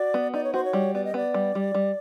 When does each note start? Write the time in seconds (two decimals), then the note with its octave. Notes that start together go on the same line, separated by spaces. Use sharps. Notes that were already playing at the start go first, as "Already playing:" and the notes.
Already playing: F#4 D5
0.14 B3
0.34 D#4 D5
0.44 C#5
0.53 F#4 C5
0.65 C#5
0.73 G3
0.94 B3 D5
1.05 D#5
1.14 B3 D5
1.34 G3
1.55 G3
1.74 G3